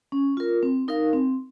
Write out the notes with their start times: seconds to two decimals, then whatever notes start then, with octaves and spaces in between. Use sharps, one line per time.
0.12 C#4
0.37 F4 A#4
0.63 C4
0.88 D#4 A#4 F5
1.13 C4